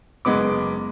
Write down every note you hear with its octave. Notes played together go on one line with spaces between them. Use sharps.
F#1 G#3 B3 D6